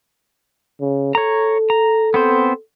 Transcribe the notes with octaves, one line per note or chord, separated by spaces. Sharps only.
C#3
A4 C#5 A#5
A#5
B3 C4 C5